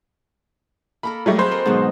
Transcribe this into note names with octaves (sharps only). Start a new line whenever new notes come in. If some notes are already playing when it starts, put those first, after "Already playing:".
A#3 A4 A#4 B5
F#3 G3 A3 D#5
C4 F#4 G#4 C5 F5 B5
A4 A#4 D#5
G#2 B2 D#3 F#3 D#5 A5